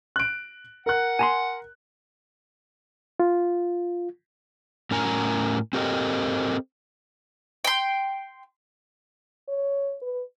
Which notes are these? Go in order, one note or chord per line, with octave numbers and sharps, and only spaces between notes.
F#6 D7
A#4 F#5 F#6
G#5 A#5 C6
F4
A2 C#4 A#4 G#5 A#5
C4 G4 A4 A#4 C5 D#5
G5 C6
C#5
B4